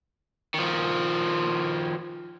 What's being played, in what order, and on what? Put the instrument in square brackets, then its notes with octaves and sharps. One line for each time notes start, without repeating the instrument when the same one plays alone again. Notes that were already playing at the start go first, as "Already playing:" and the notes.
[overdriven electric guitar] D#3 F3